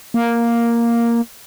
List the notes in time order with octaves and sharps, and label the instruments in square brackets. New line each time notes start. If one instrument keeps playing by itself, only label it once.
[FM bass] A#3